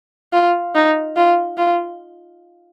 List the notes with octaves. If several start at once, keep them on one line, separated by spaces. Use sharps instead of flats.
F4
D#4
F4
F4